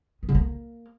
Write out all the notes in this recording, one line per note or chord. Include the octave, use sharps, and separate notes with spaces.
D#3
D3
A#3